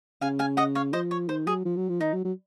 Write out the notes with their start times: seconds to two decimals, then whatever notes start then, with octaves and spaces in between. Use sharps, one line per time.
0.21 C#3 F5 G#5
0.39 F5 G#5
0.57 D#5 F#5
0.75 C#5 F5
0.93 F3 C5 D#5
1.11 C#5
1.28 D#3 C5
1.46 F#3 G#4
1.65 F3
1.77 F#3
1.89 F3
2.01 D#3 D#4
2.13 F#3
2.25 F#3